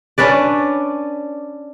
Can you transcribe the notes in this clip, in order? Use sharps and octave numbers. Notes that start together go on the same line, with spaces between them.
C#4 D4 B4 D5